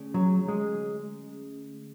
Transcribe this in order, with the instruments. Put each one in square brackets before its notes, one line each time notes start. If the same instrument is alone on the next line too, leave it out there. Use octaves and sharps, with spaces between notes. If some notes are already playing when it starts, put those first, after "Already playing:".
Already playing: [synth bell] D3 A3 C#4 G#4
[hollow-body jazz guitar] F#3
G#3